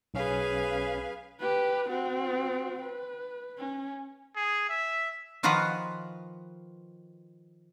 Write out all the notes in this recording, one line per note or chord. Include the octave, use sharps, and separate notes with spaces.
B1 C#4 G#4 B4 F5
G4 B4
C4 F#4
B4
C#4
G#4
E5
D#3 F3 F4 F#4 B4 A#5